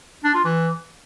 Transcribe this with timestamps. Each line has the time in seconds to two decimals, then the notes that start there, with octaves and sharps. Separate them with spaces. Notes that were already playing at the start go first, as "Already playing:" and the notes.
0.24 D4
0.34 F4
0.45 E3